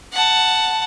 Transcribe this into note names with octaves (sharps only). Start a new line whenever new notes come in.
F#5 A5